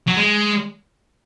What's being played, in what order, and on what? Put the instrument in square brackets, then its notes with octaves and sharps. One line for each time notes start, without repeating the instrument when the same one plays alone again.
[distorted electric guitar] F#3
G#3